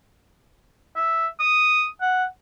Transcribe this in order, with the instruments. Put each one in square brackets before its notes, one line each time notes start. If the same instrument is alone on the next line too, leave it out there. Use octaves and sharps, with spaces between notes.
[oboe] E5
D#6
F#5